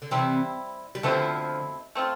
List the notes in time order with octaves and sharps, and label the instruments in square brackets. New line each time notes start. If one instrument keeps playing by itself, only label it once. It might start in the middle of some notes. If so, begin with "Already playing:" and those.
[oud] D3
[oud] C3 E3 [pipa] G3 C4 E4
[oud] G3
[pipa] B2 A3 C4 E4 [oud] D3 F3
[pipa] A3 C4 F4